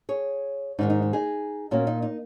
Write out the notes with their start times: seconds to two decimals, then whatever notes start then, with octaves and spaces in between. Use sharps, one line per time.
0.09 G#4 C#5
0.79 G#2 D#3 G#3 D#4
0.90 D#4
1.02 D#4
1.13 D#4 G#4
1.71 A#2 A#3 C#4 F#4
1.87 D#4
2.02 D#4